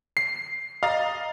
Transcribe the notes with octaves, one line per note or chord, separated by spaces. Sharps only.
C7
D#5 F5 A#5 A6